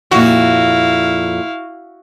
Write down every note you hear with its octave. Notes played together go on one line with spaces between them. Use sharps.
F2 A#2 E4 F#4 F5